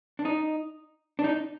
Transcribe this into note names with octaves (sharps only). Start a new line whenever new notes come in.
D4
D#4
D4
D#4